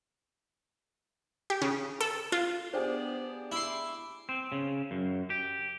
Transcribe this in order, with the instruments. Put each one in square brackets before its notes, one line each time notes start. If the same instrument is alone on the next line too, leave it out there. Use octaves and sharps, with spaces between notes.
[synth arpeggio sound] G4
C#3
A4
F4
[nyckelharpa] B3 D5 [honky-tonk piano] D4 G4 G#4 [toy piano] C5
[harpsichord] E4 C6 [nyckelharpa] D6
[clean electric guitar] C4
C#3
F#2
G4